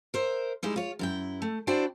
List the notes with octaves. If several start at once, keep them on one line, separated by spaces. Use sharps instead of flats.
A#4 C5 E5
G3 G#3 D#4 E4
F4 C#5
F#2 E4 G5
A3
D4 E4 F#4 C5 D5 G5